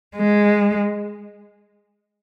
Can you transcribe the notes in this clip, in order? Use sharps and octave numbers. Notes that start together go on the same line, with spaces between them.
G#3